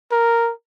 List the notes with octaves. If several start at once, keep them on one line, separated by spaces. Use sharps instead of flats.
A#4